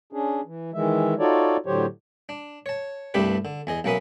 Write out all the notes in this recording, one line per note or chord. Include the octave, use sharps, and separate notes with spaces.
C#4 D4 G#4
E3
D#3 E3 G#3 E5
D#4 F4 F#4 A4 C#5 D5
A2 D3 F#3 G4 C5 C#5
D4
C#5 A5
C2 G2 A3 D4 G4 B4
D3
E2 G#4 D#5
B1 A#3 C#4 B4 E5 D#6